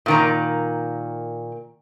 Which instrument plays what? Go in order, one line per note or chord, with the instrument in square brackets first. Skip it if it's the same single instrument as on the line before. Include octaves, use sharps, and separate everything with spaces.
[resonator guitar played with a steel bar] A#2 D#3 A#5